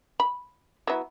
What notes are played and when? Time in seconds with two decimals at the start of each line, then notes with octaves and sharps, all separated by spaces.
0.20 B5
0.87 F#3 B3 E4